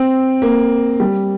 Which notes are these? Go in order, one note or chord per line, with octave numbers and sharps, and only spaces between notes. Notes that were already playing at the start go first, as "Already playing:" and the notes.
Already playing: C4
A#3
G3